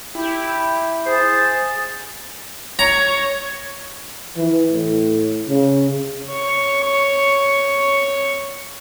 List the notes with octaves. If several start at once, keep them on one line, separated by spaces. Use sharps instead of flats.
E4 G4
G#4 C5 A5
C#5 A#5
E3
A2
C#3
C#5 C#6